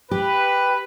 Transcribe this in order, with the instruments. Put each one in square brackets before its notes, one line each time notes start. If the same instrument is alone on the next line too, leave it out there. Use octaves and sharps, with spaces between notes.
[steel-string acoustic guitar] G4 [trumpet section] B4